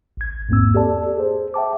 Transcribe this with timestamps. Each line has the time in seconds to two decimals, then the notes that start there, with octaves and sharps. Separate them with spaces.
0.17 A1 G#6
0.49 E2 G#2 A#3 C4 E6
0.75 G4 A4 D5 A5
1.17 G#4 C5
1.54 E5 G5 A5 D6